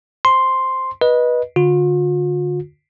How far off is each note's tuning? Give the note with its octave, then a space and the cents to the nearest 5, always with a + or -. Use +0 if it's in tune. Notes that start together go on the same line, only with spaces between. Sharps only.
C5 +0 C6 +0
B4 -20 D#5 +0
D3 +0 F4 +45